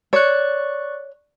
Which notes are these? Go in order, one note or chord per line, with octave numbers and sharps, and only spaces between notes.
C#5 D5 C#6 F#6